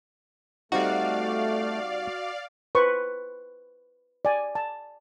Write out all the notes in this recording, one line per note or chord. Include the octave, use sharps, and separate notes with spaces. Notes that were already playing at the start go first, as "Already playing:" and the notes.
G3 A3 C4 D#4 F#4 D5 F5
B4 C5 C#6
D5 G#5
A5